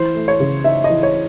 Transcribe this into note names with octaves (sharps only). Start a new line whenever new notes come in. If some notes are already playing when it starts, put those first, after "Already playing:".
Already playing: E3 C5
A3
C#5
C#3
D#4 E5
D#5
E3
C#5